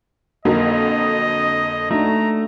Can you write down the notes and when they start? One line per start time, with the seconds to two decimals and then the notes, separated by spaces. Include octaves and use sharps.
0.45 F2 D3 F#3 A#3 F#4 A#4 D#5
1.91 A3 D4 D#4 F#4 A#5